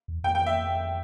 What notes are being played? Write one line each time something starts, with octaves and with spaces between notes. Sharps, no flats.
E2
F2 G5
G5
E5